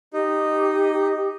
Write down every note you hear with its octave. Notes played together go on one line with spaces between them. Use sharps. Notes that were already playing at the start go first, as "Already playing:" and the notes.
D#4 G4